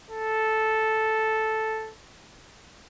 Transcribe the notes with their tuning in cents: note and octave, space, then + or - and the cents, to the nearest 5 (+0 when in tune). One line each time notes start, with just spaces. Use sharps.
A4 -5